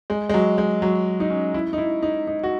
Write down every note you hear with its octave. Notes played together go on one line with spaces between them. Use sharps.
G#3
G#3
F#3
G#3
F#3
D#4
C#4
E4
D#4
E4
D#4
D#4
F#4